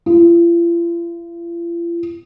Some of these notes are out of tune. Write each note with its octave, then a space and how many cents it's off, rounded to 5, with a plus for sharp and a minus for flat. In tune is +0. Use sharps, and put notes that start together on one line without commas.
F4 -45